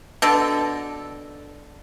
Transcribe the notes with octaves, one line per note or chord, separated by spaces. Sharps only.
B2 D3 A4